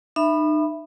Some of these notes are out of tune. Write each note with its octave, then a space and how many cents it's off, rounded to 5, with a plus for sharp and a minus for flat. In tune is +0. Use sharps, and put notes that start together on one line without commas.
D#4 -40 E5 +0 B5 +0